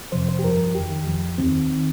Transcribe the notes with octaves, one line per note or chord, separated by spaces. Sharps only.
F2 C3 F3 C5
C5
G4
G2 F3 A#4
F2 D#3 G4
F2 F3
D#2 D#3 C4
D#3